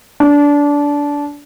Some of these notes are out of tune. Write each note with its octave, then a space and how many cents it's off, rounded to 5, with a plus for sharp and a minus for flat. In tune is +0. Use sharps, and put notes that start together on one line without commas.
D4 -20